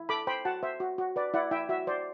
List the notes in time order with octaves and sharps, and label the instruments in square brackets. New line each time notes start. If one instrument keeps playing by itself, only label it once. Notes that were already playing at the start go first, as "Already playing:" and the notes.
Already playing: [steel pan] E4
A4 B5 D6
C5 G5 B5
F#4 F#5 A5
C5 E5
F#4
F#4
B4 D5
E4 D5 F#5
E4 E5 G5
F#4 E5
C5 D5